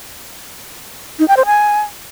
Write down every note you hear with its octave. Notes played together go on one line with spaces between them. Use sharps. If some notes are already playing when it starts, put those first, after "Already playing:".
D#4
G5
C5
G#5